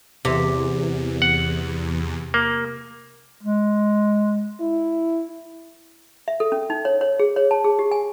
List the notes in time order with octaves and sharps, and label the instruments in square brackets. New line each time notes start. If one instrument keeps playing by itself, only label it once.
[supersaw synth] E2 [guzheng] C3
[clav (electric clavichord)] F#5
A#3
[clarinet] G#3
[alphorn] E4
[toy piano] E5
A4
C#4
D#4
C#5
C#5
G#4
C#5
A5
G#4
G4
G#5